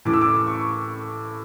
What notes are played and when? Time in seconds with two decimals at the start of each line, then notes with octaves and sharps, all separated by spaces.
0.05 A2 E3 D6
0.13 E6
0.21 D6
0.47 C#6